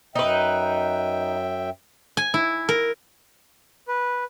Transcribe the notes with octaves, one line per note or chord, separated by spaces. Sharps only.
F#2 D#4 B4 E5 G5
G#5
E4
A#4
B4